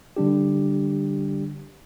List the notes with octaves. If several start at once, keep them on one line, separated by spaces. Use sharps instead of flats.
D3 G3 D4 G4